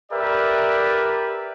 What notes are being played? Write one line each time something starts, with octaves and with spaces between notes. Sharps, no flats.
G4 A#4 B4 D5 E5